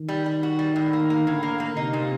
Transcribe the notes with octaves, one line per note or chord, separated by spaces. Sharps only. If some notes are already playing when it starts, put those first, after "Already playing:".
Already playing: D#3
G3
G3
F#4
G3
A2
A#3
A#3
A2 D3
A#3
A#3
C3 D#4
A#2